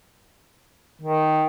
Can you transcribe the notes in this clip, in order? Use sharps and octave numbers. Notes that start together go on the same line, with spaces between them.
D#3